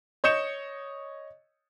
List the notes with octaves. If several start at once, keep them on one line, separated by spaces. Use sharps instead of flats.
C#5 D#5 G6 C#7 E7